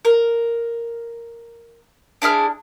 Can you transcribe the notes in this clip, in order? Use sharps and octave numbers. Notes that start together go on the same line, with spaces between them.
A#4
D4 E4 G#4 F6